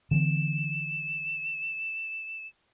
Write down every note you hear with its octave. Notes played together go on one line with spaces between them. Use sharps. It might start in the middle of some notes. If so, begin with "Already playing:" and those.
D3 E3 B3 E7